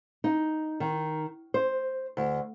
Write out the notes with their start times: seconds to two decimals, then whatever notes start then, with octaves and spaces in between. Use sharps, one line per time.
0.24 D#4
0.80 D#3
1.54 C5
2.17 D2